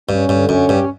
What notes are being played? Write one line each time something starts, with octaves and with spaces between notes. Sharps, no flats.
G2 C#4
G2 D3
F#2 C#4
G2 G4